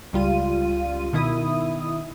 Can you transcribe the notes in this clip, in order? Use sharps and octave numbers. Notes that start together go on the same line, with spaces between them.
C#2 G3 F4 D#7
B2 D#3 E4 D#6